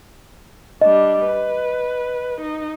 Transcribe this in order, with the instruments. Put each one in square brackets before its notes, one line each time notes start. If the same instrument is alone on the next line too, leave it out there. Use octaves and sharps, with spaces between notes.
[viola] G3 D4 [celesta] D#5
[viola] B4
D#4